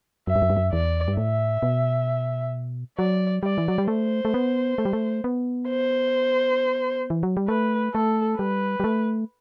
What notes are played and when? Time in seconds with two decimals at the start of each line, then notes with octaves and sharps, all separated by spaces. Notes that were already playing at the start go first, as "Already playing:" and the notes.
0.27 F#2 E5
0.36 G2
0.42 F#2
0.50 G2
0.57 F#2
0.73 E2 D5
1.08 G2
1.17 A2 E5
1.62 B2
2.99 F#3 D5
3.43 G3 D5
3.58 E3
3.68 F#3
3.78 G3
3.88 A3 C5
4.25 A3
4.34 B3
4.78 A3
4.85 G3
4.93 A3
5.24 B3
5.69 C5
7.10 E3
7.23 F#3
7.37 G3
7.48 A3 B4
7.94 A3 A4
8.39 G3 B4
8.80 G3
8.84 A3